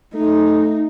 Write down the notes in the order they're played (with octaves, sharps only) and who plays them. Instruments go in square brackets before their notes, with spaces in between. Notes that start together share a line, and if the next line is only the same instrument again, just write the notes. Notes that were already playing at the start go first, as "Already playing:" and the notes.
[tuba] A3 [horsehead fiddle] D#4